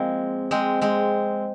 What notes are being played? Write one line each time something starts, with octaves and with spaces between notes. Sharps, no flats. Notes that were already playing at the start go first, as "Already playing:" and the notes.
Already playing: F3 G#3 A#3 C4
G#3 C4
G#3 C4